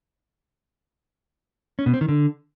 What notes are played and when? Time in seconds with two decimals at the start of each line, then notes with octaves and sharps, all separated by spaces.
1.79 C#4
1.86 B2
1.94 C4
2.01 D#3
2.09 D3